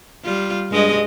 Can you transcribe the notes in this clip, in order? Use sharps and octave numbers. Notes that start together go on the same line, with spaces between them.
G3 F4
G2 G#3 D#5